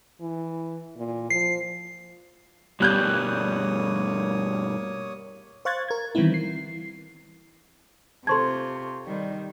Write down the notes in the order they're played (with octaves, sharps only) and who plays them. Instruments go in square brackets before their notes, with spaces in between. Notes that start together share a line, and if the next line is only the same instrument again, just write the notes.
[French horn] E3
A#2
[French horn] F3 [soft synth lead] C7
[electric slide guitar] G2 B2 [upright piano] G3 F#6 G6 [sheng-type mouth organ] A#3 C#5 D#6
[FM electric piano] C5 F5 C#6 F#6 G#6 A6
A#4 G#6
D#3 E3 G3 B3 C4 E4
C7
[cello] C3 F4 [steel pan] A4 C5 A5 [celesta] C6 C#6 G#6
[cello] D#3 G3